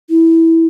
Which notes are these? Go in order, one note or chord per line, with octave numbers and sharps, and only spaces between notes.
E4